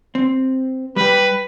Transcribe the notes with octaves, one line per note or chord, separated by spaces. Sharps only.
C4
G3 G4 B4